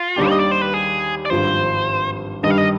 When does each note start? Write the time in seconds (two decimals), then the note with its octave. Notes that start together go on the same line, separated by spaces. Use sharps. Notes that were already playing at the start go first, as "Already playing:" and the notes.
Already playing: F4
0.16 D#2 D#3 G3 D4 G4
0.29 D#5
0.40 D5
0.51 C5
0.62 B4
0.74 G#4
1.25 D5
1.30 G#1 G2 F3 C5
2.43 G2 D#3 G3 D#5
2.50 F5
2.58 D#5